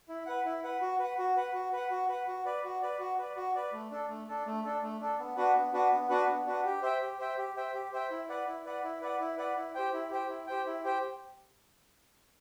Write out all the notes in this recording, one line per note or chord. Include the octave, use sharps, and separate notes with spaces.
E4
B4 F#5
E4
B4 F#5
F#4
B4 F#5
F#4
B4 F#5
F#4
B4 F#5
F#4
B4 F#5
F#4
B4 D5
F#4
B4 D5
F#4
B4 D5
F#4
B4 D5
A3
D4 A4
A3
D4 A4
A3
D4 A4
A3
D4 A4
B3
D4 F#4 B4 F#5
B3
D4 F#4 B4 F#5
B3
D4 F#4 B4 F#5
B3
D4 F#4 B4 F#5
G4
C5 E5 G5
G4
C5 E5 G5
G4
C5 E5 G5
G4
C5 E5 G5
E4
B4 D5 F#5
E4
B4 D5 F#5
E4
B4 D5 F#5
E4
B4 D5 F#5
E4
G4 C5 G5
E4
G4 C5 G5
E4
G4 C5 G5
E4
G4 C5 G5